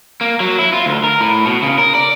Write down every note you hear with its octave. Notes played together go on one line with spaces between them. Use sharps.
A#3
F#3
E4
F4
D2
A#4
A2
B2
C#3
A#4
D5